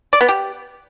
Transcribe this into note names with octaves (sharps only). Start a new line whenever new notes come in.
D5
B3
G4